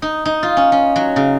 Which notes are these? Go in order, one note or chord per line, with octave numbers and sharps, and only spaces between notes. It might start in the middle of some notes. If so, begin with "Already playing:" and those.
D#4
D#4
F4
C#4
C#4
F#3
C#3